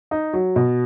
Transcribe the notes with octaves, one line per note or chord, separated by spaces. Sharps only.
D#4
F#3
B2